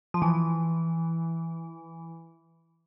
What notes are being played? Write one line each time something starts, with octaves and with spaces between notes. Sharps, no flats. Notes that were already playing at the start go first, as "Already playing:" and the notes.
F3
E3